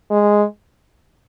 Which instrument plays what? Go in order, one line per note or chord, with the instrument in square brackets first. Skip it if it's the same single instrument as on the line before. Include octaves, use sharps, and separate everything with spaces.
[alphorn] G#3